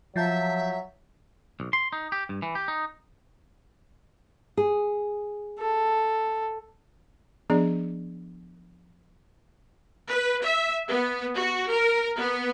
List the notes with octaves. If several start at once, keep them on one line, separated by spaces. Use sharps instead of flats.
F3 F#3 E5 F5 A5 A#5 G6 A6
B1
C6
D#4
G4
G2
E3
G4
D#4
G#4
A4
F3 B3 D4 G#4 D5
B4
E5
B3
F#4
A#4
B3